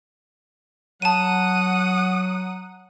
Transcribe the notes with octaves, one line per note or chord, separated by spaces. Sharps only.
F#3 F#5 A5 D#6 D#7